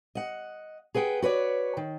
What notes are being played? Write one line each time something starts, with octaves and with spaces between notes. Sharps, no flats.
D#5 F#5
G#4 B4 F#5 G5
F#4 B4 C#5 D5
D#3